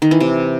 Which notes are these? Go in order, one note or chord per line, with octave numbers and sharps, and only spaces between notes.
D#3
E3
C3